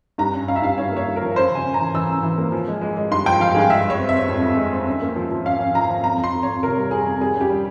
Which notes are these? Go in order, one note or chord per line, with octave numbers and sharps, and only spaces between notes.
G2 A#5
C#4
C#4 F5
E5
G2 F5
G2 C#5
A#3 C#5
G2
A#4
F3
C#4 C5
C#3
G#5
C#4
E3 A#5
E3 E6
C#4
E3
A#3
F3
G#3
G#3
G#3
G2 C6
F3 G5
F3 F5
G2 G#4
G#3 E5
G#3
C#5
C4
C4 E5
F2
F2
G#3
C4
C#4
A#3
F3
F3
C#4 F5
C#4
F3 A#5
F3
F2 A#5
F2
C6
F2
F2 C#5
C3 A#4
G3
G3 G#4
F2
G3 G#4
C#4
G4
G3